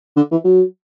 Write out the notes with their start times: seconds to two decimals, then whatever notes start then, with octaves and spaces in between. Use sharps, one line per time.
0.16 D3
0.31 E3
0.45 F#3